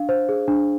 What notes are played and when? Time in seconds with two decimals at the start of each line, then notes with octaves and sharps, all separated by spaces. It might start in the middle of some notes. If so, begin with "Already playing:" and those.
Already playing: D4 F5
0.09 C5
0.29 G#4
0.48 D4